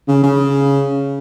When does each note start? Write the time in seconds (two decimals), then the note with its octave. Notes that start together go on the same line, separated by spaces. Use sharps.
0.08 C#3
0.23 C#3